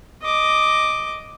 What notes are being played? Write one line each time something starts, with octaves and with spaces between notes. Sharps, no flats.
D#5 D6